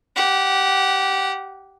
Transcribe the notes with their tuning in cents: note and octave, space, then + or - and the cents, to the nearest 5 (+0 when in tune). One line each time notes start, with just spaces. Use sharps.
G4 -15 F#5 +0